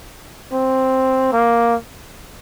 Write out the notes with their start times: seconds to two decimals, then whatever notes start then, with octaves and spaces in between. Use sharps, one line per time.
0.53 C4
1.33 A#3